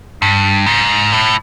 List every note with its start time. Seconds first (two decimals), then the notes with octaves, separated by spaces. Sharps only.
0.22 G2
0.66 G#2
1.12 A2